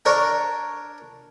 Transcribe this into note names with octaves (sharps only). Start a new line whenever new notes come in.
D4 A#4 C#5